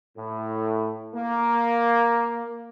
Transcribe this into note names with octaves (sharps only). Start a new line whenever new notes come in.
A2
A#3